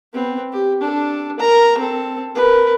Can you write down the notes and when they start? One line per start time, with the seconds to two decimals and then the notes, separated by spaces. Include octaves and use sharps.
0.13 B3 C4
0.53 G4
0.81 D4 A4
1.39 A#4 A#5
1.78 C4 A4
2.35 A#4 B4